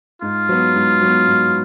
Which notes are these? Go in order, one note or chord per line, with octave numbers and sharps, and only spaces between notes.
G#2 F4
F#3 B3
G#2
F#3 B3
G#2